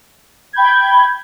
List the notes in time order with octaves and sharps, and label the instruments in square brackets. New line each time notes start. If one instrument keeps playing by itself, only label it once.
[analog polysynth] G5 B5 G6 G#6